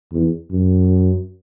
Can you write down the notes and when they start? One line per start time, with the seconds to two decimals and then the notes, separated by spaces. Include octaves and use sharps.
0.12 E2
0.51 F#2